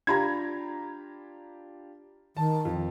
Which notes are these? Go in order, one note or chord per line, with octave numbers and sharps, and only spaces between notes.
D4 F4 G4 A#5 B5 G#6
D#3 A5
F2